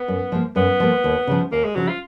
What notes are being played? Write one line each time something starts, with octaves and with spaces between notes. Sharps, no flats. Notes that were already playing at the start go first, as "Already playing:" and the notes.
Already playing: B3
F#2
F3 A#3
F#2 B3
F3 A#3
D#2
C#3 F3
D#2 A#3
G#3
C#3 F3 F#3
F4